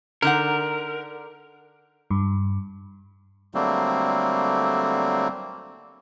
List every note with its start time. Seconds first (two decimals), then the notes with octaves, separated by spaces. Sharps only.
0.22 D3 D#4 A#4 F#5
2.11 G2
3.55 D3 F#3 G3 A3 A#3 C4